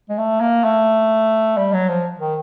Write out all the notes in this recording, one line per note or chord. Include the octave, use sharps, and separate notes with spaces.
G#3
A3
A#3
A3
G3
F#3
F3
D#3